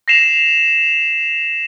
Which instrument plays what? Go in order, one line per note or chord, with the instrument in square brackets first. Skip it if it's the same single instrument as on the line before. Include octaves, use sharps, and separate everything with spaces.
[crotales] A#6 C7 E7 F7